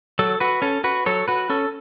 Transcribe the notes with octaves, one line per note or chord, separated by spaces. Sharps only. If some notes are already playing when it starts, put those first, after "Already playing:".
F#3 A4
F#4 B4
C#4 A4
F#4 B4
F#3 A4 C#5
F#4 B4
C#4 A4